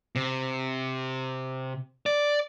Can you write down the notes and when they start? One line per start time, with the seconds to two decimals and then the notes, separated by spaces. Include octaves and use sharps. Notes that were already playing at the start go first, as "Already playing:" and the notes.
0.15 C3
2.06 D5